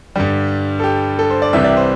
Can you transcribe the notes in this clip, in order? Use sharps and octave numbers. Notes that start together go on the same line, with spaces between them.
G2 D3 G3
A4
G4
A4
C5
D5
C2 C3 E3 G3 E5
D5
C5